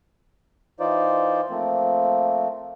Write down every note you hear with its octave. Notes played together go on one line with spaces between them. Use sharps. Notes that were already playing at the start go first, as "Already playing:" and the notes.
E3 D#4 F4 C5 D5
F3 A3 A#3 C4